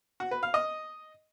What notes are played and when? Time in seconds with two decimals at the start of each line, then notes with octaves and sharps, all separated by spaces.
0.20 F#4
0.31 B4
0.43 F5
0.54 D#5